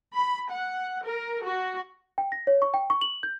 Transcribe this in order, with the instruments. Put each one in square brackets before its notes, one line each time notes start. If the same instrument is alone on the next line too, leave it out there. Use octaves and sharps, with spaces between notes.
[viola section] B5
F#5
A#4
F#4
[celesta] G5
A#6
C#5
C#6
G5
C#6
F#7
G6